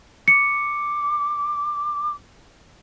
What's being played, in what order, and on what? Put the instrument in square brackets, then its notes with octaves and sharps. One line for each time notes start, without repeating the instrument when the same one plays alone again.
[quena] D6 [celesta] C#7